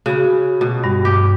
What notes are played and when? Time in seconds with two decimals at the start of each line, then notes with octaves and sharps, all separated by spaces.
0.06 C#3 F#4 B5
0.61 B2
0.84 G2 G3
1.05 G4